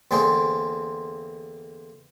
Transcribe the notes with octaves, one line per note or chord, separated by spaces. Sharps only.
E2 D3 A#3 C4 G#4 C5